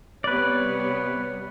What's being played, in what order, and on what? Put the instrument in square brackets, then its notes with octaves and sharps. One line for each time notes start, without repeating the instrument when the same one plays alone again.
[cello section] C3 G3 B3 [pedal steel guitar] B4 D5 [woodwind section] C#5